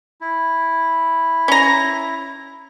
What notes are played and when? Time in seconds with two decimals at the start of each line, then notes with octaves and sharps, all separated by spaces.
0.21 E4
1.48 C#4 A#5